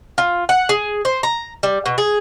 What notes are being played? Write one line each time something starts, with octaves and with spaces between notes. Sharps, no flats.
F4
F#5
G#4
C5
A#5
G3
B2
G#4